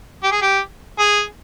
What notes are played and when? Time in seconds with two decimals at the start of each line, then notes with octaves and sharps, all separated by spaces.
0.24 G4
0.32 G#4
0.42 G4
0.99 G#4